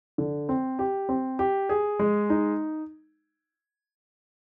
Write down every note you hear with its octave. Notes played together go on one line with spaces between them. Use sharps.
D3
C4
G4
C4
G4
G#4
G#3
D#4